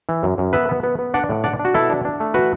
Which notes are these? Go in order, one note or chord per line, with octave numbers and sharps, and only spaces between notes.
E3
F#2
F#2
B3 B4 E5
B3
B3
B3
D4 D5 F#5
A2
D4 D5 F#5
D4
F#4
B2 E4 A4
D4
D4
A3
E3 F#4 B4